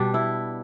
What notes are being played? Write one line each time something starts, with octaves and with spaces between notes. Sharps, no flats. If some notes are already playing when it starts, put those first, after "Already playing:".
Already playing: B2 G3 D4
E4